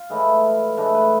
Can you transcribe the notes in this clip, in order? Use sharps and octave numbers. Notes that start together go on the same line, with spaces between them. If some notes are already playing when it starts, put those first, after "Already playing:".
Already playing: F4
A2 E3 G#3
A2 E3 G#3 D4
B4